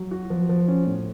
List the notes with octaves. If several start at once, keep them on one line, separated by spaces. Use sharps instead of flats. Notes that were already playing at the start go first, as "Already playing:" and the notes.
Already playing: F#3
F#4
F3
F3
C#4
A2